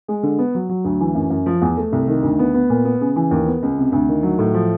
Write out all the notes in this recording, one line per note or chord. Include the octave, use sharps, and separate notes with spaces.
G#3
D3
B3
F#3
F#3
D2
E3
F#2
F#2
F3
E2
A3
C2
D#3
D2
B3
B3
A#2
B3
C#3
E3
D#2
B3
C#2
C3
D2
D#3
F#3
A2
F3